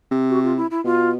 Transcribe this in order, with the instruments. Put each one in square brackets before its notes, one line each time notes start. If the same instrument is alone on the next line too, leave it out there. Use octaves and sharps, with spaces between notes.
[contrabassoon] C3
[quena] F#4
F4
E4
E4
[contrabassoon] B2 [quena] F4